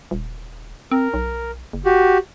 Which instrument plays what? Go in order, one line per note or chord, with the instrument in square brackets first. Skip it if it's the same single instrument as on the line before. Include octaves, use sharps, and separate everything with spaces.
[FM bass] D#1
[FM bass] C4 [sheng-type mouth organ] A#4
[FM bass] B1
F#1
[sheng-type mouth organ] F#4 G4